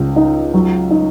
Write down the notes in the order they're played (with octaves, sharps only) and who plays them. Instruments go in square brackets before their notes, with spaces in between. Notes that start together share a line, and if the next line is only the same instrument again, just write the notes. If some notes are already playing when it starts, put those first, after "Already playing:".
Already playing: [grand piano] C#2
D#4
F#3
D#4